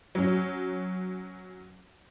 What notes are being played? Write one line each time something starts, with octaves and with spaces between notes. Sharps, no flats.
F#3 C#4